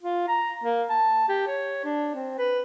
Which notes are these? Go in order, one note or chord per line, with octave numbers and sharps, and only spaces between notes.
F4
A#5
A#3
A5
G4
C#5
D4
C4
B4